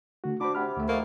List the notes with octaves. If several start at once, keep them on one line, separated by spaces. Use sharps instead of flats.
D3 A3 F#4
D4 F#4 C5 B5 D6
C3 F#5 B5 F6
D2 A3
D#3 F3 A3 A#3